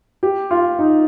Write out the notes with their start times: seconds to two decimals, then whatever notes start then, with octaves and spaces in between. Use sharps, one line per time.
0.23 G4
0.51 F4
0.79 D#4